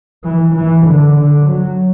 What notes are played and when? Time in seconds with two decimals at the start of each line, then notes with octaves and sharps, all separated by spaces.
0.24 E3
0.55 E3
0.85 D3
1.16 D3
1.46 F#3